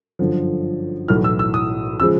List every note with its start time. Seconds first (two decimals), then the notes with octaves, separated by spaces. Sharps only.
0.19 G1 F#2 D3 F3
1.08 B1 A2 E3 F6
1.24 E6
1.39 E6
1.54 D#6
2.00 C#3 F3 G#3 E6